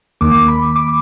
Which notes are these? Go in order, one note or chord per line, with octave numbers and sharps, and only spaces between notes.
D#2 D#3 A#3 D6
B5
D6